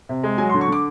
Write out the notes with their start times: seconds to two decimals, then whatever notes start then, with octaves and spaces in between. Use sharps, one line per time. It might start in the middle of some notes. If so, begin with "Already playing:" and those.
0.09 C3
0.23 G#3
0.38 F#3 G#5
0.49 C6
0.54 D3
0.61 C#6
0.68 D3 D6